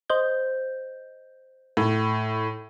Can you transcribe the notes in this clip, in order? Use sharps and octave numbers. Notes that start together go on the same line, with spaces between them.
C5 D#5 G6
A2